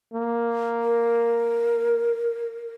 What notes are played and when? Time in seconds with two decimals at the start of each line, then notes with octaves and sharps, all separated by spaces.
0.14 A#3
0.82 A#4